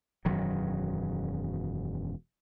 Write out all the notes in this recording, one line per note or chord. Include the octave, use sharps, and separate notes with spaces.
E1 F#2 D#3 F#3